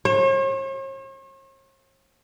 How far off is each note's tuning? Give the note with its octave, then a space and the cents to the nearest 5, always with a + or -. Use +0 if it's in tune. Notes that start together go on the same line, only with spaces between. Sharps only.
C#5 -45